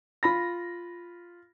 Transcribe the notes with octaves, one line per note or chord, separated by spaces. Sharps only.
F4 B5 A#6